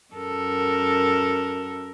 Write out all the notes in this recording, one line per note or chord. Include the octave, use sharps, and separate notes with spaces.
F#2 A4 A#4